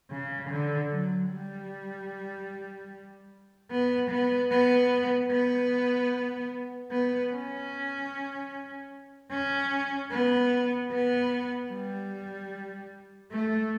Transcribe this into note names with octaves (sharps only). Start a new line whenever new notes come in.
C#3
D3
F#3
G3
B3
B3
B3
B3
B3
C#4
C#4
B3
B3
G3
A3